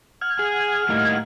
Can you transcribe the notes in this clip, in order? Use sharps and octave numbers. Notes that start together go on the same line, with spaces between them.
F#5 F6 G#6
G#4
A2 G3 A#3 D#4